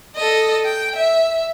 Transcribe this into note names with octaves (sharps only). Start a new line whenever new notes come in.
A4 D#5
G5
E5